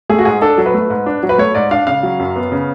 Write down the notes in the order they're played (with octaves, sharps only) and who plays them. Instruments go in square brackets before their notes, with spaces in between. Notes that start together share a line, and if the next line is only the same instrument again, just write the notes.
[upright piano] A3 G#4
F#4
G#2 G#4
D4 A4
F#3
B4
A3
G#2
D4
F#3
B4
A3 C#5
G#2 D5
D4 F5
C#3 F5
F#3
F#2
B3
C#3